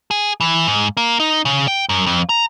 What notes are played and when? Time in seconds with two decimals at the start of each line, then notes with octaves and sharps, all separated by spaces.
0.11 G#4
0.41 E3
0.67 G#2
0.97 A#3
1.20 D#4
1.45 C#3
1.68 G5
1.89 F#2
2.06 F2
2.29 A#5